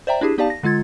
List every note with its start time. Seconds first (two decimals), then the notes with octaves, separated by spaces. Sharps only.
0.07 C5 D5 E5 G5 A#5
0.21 D4 E4 G4 G#4
0.38 B3 D#4 G4 D5 F5 A5
0.50 A#6
0.63 D3 G#3 F4 G#6 A6